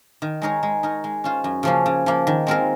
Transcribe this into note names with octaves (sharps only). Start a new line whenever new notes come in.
D#3
G#3 D#4 A#4 C#5
G#3
D#4 A#4 C#5
G#3
C#4 F4 C5
F#2
C#3 F3 A#3 C#4
C#3
F3 A#3
D#3
G#3 C4 F4 A#4